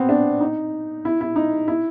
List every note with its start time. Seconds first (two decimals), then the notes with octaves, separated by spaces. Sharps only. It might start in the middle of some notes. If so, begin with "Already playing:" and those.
Already playing: B3 C4
0.09 D4
0.41 D#4
1.05 E4
1.21 E4
1.36 D#4
1.68 E4